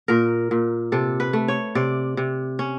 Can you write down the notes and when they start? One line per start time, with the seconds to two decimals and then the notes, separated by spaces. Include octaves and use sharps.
0.08 A#2 A#4
0.51 A#2
0.92 C3 A4
1.20 B4
1.33 A3
1.48 C#5
1.75 C3 D5
2.17 C3
2.59 C#4